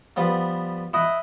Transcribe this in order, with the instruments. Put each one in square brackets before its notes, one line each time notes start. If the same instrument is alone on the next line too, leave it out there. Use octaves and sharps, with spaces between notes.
[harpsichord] F3 G3 B3
E4 D#5 F#5